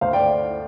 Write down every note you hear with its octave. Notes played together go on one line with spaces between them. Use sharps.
D2 C5 F5
D5 G5